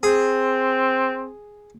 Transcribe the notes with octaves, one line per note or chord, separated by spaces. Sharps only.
C4 G#4